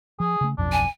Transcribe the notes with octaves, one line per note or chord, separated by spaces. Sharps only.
F3 G#4
C#3 A3
D1 B1 F2 D4
G#5